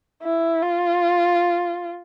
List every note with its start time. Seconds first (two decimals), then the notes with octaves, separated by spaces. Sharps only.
0.23 E4
0.63 F4